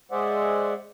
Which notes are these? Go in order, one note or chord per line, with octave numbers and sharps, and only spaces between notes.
G#3 G#4 C5 D5 E5 F#5